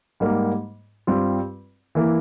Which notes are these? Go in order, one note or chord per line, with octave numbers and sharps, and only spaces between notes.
G#2 G3 A#3
G2 G3 C4 F4
E3 A#3 E4